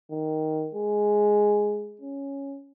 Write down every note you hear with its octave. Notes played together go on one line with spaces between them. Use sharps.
D#3
G#3
C#4